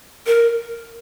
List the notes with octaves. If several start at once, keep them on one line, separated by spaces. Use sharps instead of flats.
A#4